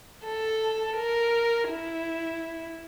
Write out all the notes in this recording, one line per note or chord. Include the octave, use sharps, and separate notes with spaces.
A4
A#4
E4